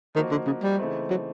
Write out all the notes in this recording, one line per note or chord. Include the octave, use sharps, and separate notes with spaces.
D#3 F3 A#3 D#4 F#4
D3
C#3
G3
C#3 E3 A3 C4 D#4
F#3